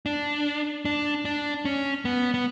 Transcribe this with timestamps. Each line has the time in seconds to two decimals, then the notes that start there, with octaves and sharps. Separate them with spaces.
0.06 D4
0.85 D4
1.25 D4
1.65 C#4
2.05 B3
2.34 B3